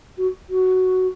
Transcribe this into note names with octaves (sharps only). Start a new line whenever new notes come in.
F#4
F#4